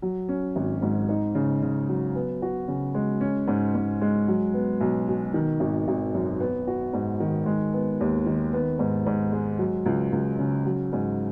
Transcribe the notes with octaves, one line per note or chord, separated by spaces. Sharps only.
F#3
C#4
G#1
G#2
D#4
C#3
C#3
F#3
B3
F#4
C#3
G#3
C#4
G#2
G#2
G#3
F#3
B3
B1
B2
D#3
G#1
G#1
F#2
B3
F#4
G#2
D#3
G#3
B3
D#2
D#3
B3
G#2
G#2
G#3
F#3
C#2
C#2
C#3
F#3
G#2